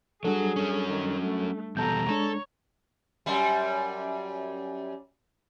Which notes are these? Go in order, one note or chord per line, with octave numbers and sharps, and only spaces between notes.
F#3 G3 D4 F#4 G#4 A4
F#3 C#4
D#3
A3
E2 B2 G3 A4 A5 A#5 G6
G#3 D4 A4 C#5
F#2 G3